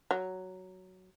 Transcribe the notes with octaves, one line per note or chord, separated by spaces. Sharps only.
F#3